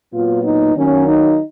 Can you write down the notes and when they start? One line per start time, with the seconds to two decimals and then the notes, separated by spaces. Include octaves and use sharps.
0.11 A#2 F#3 B3 F4
0.43 D#4
0.74 D#3 F#3 A#3 C#4
1.06 D#4